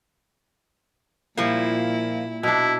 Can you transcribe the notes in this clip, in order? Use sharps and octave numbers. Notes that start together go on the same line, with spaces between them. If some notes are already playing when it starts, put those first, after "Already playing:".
A#2 F3 G3 A#3 E4
B2 A#3 D4 E4